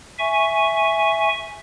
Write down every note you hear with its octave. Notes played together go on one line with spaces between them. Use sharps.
E5 G#5 C#6